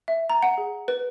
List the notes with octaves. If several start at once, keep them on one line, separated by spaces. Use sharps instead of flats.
E5
A#5
F#5
G#4
B4